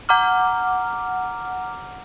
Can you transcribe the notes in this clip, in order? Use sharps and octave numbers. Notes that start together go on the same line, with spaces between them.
F#5 A#5 D6 F6